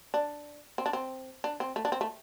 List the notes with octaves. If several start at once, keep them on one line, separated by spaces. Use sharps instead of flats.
D4
C4
D4
C4
D4
C4
A3
D4
C4
A3